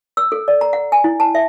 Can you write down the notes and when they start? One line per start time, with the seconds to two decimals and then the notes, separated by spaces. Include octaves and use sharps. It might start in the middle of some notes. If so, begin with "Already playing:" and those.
0.17 E6
0.32 A4
0.48 D5
0.61 A#5
0.73 F#5
0.92 G#5
1.04 E4
1.20 A5
1.35 E5